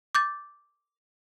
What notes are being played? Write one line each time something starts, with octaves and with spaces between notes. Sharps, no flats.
D6 G6 A6